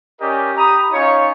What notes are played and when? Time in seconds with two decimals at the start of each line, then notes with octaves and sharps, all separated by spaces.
0.21 C#4 G4 A#4 D5 D#5
0.57 G4 A#5 B5 D#6
0.92 C#4 D#4 F4 C#5